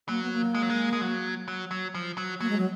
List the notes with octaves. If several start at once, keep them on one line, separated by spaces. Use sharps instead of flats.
F#3 A#3
B3
A#3
G#3
F#3
G#3
G#3
F#3
F#3
F#3
F3
F#3
F#3 A#3
G#3
F#3